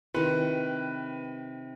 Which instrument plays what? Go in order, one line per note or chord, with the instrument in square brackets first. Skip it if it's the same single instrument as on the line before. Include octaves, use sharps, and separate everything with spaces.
[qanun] C3 D#3 [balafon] E4 [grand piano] B4